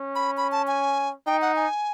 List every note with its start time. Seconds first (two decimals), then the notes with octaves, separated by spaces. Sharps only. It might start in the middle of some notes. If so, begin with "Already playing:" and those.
Already playing: C#4
0.15 B5
0.37 B5
0.52 A5
0.67 G#5
1.27 D#4 G5
1.42 F#5
1.56 G#5